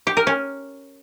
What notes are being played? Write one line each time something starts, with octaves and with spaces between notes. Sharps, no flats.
G4
A#4
C#4